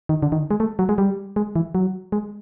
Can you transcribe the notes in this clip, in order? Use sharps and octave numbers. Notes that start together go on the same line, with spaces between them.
D#3
D3
D#3
G#3
A3
F#3
G#3
G3
G#3
E3
F#3
G#3